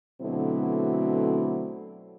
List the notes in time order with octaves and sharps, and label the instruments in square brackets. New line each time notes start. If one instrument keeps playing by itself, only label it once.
[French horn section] B2 D3 F#3 A3 C4 E4